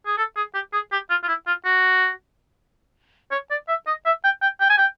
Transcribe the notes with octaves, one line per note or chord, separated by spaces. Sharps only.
G#4
A4
G#4
G4
G#4
G4
F4
F4
E4
F4
F#4
C#5
D5
E5
D#5
E5
G5
G5
G5
G#5
G5